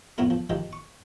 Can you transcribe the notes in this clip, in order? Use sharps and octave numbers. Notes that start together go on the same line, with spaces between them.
F2 A2 B3 C#4 E4 A#4
F3
D#3 F3 G#3 G4
C#6